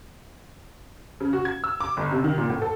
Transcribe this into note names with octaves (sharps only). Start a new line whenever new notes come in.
C#3
F#4
G#6
E6
D6
G1
C3
D#3
A#2
A2
A4